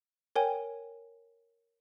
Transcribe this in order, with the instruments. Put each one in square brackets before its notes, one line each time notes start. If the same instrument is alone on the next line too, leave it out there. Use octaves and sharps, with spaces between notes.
[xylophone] A#4 C#5 G5 G#5